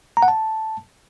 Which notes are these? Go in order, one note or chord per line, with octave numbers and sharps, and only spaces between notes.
A#5
F#5
A5